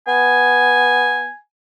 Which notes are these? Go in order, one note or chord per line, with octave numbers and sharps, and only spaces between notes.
B3 G#5